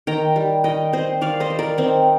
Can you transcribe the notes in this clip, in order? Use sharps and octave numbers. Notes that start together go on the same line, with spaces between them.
D#3 G5 A#5
G3
D#3 D#5 G5
C4 C5 D#5
D#3 D5 F5
C5 D#5
G3
A#4 D5
D#3 C4 D#4